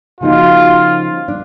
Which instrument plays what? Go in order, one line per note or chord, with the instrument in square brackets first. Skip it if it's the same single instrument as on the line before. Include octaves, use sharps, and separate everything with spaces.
[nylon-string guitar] C#3 F3 A#3 D#4 F#4 [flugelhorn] F4
[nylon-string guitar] D4